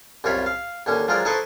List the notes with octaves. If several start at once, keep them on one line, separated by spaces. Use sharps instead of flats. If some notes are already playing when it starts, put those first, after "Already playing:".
C2 F#2 F4 C#5 B5
F5
D#2 D3 C#4
F3 F#3 G#3 F4 A#4 D5
D#4 E4 A4 B4 C5 C#6